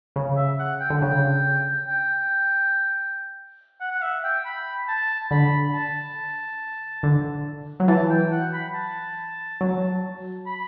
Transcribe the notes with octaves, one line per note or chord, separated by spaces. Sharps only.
C#3
E5
F#5
G5
D3
C#3 G5
G5
F#5
F#5
E5
G5
B5
A5
D3 B5
A5
D3
F#3
E3 A5
G5
F#5
B5
A5
F#3
B5